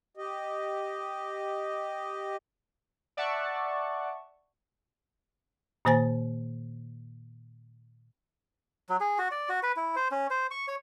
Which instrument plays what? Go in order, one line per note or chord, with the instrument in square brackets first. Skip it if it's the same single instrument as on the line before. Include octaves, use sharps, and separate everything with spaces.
[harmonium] G4 D#5
[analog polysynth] D5 E5 F#5 A5 C#6
[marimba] A#2 D#3 A#3 C5 G#5 A6
[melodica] F#3
G#4
F#4
D5
F#4
B4
E4
C5
C#4
C5
C#6
C#5